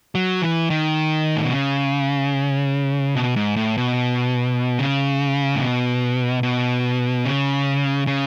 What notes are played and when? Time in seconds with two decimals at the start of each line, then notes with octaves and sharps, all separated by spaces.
0.15 F#3
0.42 E3
0.70 D#3
1.36 A2
1.44 B2
1.52 C#3
3.15 B2
3.36 G#2
3.56 A2
3.77 B2
4.79 C#3
5.55 A2
5.61 B2
6.43 B2
7.25 C#3
8.07 C#3